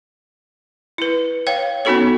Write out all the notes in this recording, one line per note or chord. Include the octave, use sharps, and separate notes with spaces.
E4 B4
C#5 F5 G5
B3 C#4 D#4 F#4 A4 C#5